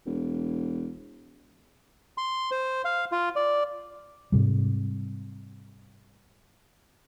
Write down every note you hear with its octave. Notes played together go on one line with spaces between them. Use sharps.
E1
C6
C5
F5
F4
D5
G#2 C3 G3